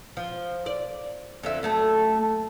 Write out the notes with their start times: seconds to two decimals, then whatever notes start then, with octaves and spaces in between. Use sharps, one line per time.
0.17 F3
0.66 D5
1.43 F2 D3 E5
1.63 F#2 A3 A4